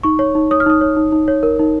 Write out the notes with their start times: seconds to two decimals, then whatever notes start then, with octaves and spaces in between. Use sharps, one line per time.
0.03 D#4 C#6
0.19 C#5
0.35 D#4
0.51 C#5 D#6
0.60 F6
0.66 D#4 D#6
0.81 C#5
0.97 D#4
1.12 D#4
1.28 C#5
1.43 A#4
1.59 D#4